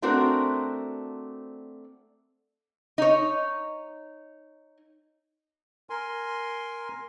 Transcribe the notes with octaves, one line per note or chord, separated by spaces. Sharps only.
A3 C4 D4 F#4 A#4 C5
D#4 C#5
A#4 G#5 C6